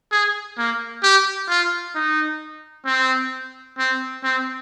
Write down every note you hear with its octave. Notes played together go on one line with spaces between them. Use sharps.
G#4
A#3
G4
F4
D#4
C4
C4
C4